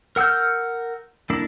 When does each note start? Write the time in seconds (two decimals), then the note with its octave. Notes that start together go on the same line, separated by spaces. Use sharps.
0.16 A#4 F#5 E6 F6 G6
1.30 A#3 D4 E4 A4